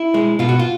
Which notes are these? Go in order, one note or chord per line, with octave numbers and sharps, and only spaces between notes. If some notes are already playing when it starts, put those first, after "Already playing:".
Already playing: E4
G#3
B2 F4
F#4
F4